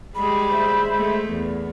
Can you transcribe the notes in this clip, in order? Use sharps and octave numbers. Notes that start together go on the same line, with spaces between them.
G3 G#3 G#4 B5
C5 E5
G#3 A3
E2 B3